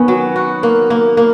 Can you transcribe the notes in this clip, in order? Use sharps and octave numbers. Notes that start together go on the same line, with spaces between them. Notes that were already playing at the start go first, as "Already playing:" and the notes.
Already playing: D#3 B3 C#4
F#3
F#4
A#3
A#3
A#3